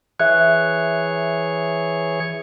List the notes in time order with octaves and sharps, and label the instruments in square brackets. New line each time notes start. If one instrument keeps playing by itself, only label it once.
[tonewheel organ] E3 G#4 C#5 [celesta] E5 F#6